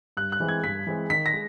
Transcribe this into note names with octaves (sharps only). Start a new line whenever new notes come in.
G2 F#6
F#6
E3 G#3 C4
G#6
G2 B6
E3 G#3 C4
D#3 B6
A#6
G#3